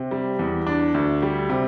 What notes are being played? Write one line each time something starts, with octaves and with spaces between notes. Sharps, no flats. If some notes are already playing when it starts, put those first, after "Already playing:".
Already playing: C3
G3
E2
D4
D2
G3
C3